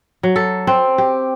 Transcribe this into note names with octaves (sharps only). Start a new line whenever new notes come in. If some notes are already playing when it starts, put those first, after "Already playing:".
F#3
A4
C4
G4